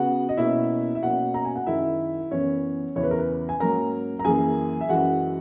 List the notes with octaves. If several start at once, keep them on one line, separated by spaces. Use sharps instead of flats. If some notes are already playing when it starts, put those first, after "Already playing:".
Already playing: C#3 B3 F#4 F#5
D#5
B2 A#3 C#4 E4 E5
E5
B2 A#3 C#4 F#4 F#5
A#5
G#5
F#5
F#2 D#3 G#3 E4 E5
F#2 E3 B3 C#4 C#5
E2 C#3 E3 C#5
B4
A#4
B4
G#5
G#2 F#3 A#3 C#4 A#4 A#5
A#5
F#2 E3 A#3 G#4 G#5
E5
F#2 E3 G#3 F#4 F#5